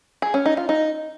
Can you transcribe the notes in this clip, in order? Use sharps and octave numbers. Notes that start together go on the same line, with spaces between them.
G#4
C#4
D#4
F4
D#4